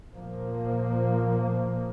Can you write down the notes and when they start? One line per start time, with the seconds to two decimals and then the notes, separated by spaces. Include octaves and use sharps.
0.15 A#2 F3 A#3